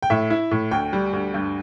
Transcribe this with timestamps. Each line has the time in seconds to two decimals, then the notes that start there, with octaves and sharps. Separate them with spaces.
0.03 G5
0.10 A2 E5
0.30 E4
0.51 A2
0.71 D2 G5
0.93 G3
1.13 D2
1.34 G2